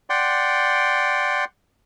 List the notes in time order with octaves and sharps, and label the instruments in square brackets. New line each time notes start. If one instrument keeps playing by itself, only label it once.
[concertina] D5 F#5 G5 C6